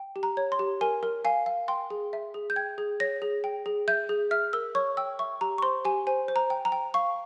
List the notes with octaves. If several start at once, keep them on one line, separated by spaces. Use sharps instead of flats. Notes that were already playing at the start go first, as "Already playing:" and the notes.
Already playing: G5
G4
A#5
C#5
C6
G4
A#4 G#5
A#4
F5 G#5
F5
G5 C6
G#4
E5
G#4
G6
G5 G#6
G#4
C#5 A#6
G#4
G5
G#4
E5 G6
G#4
E5 F6
A#4 E6
C#5 C#6
G5 E6
E5 C#6
G4 A#5
C#6
C5 C6
G4 G#5
C5 G#5
C5
A#5
G5
A#5
G5
F5 C#6